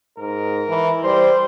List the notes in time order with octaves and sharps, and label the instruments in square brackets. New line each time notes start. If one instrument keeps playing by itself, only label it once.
[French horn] G#2 [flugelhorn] A#4
[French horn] E3
[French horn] G3 [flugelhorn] C5